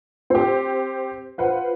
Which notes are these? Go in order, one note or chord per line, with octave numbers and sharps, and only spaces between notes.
C4 G4
F4 B4 C5 F#5